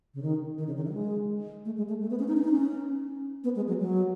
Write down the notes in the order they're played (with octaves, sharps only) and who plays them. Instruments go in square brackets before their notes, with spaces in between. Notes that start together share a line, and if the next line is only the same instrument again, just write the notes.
[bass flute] C#3
D#3
D#3
C#3
D#3
E3
F#3
G#3
A3
G#3
A3
A3
B3
C#4
D#4
C#4
D#4
C#4
B3
G#3
F#3
F#3